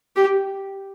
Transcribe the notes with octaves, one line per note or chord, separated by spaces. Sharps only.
G4